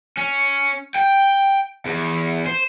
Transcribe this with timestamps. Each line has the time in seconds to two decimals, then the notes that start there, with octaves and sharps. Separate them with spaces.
0.17 C#4
0.96 G5
1.85 E2
2.46 C5